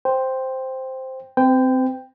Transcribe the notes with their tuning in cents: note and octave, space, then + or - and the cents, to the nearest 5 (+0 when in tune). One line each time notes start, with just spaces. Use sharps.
C5 +0 G5 +0
C4 -15 C5 -45 G5 +0